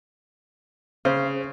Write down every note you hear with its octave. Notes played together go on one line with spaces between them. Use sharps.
C#3 C5